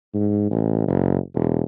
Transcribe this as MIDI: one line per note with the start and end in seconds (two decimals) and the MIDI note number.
0.14 0.47 44
0.50 0.86 33
0.87 1.17 30
1.35 1.62 28